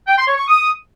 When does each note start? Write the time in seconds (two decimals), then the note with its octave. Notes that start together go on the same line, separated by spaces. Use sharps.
0.08 G5
0.18 C6
0.28 C#5
0.38 C#6
0.48 D#6